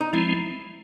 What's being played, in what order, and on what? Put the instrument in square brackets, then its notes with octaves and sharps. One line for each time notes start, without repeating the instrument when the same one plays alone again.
[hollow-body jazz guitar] D#4
[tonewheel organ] F3 G#3 C4 [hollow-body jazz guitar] E4